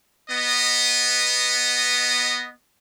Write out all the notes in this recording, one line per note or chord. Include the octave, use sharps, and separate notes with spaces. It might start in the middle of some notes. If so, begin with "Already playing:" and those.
B3 D#5